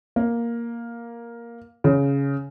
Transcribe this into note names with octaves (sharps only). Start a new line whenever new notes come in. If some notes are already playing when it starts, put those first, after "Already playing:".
A#3
C#3